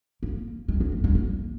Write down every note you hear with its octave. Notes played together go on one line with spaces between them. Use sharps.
A#3
G#3
A#3
A#3
G#3
A#3